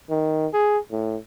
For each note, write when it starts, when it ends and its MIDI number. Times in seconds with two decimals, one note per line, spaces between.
0.10 0.47 51
0.54 0.78 68
0.92 1.17 45